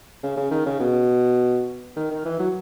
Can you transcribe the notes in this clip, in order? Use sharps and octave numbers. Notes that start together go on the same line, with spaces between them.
C#3
C#3
D#3
C#3
B2
D#3
D#3
E3
F#3